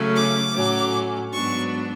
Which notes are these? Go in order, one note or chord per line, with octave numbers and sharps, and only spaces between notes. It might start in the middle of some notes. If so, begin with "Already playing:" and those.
Already playing: C#3 F#3 A3 C#4
D6
A2 F#3 C#4
G#2 F#3 B3 D4 C#6